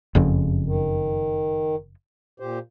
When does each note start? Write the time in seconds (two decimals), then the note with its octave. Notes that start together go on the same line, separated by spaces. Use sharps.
0.15 F#1 F2 C#3
0.66 D#3
2.40 A#2 G4 C5